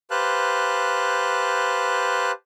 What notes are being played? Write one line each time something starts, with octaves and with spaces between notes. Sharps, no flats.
G4 B4 C5 F5 A5 F#6